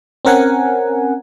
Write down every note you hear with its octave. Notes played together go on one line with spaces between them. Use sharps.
C4 C#4 A#4 F#5 G#5